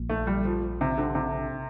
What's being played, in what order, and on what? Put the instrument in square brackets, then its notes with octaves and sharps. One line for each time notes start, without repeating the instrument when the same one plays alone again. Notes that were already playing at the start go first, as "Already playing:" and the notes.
Already playing: [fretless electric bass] A#1 A#2
[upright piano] A3
G3
F3
C3
D3
C3